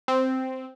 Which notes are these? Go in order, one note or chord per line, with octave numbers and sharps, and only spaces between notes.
C4